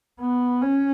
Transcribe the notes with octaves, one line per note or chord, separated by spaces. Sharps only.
B3
C#4